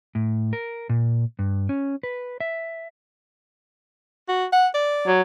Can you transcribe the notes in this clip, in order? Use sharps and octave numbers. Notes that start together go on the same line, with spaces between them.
A2
A#4
A#2
G2
C#4
B4
E5
F#4
F#5
D5
F#3